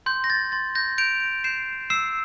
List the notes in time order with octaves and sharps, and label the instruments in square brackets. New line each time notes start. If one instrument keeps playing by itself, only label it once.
[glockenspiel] C6 G6
A#6
A6
C6 A6
G6 A#6
G6 D7 F7
G6 C7 E7
E6 C7 E7